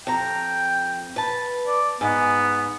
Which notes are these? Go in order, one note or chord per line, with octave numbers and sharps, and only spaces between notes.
F2 G5 A#5
B4 A5
D5
G#2 B3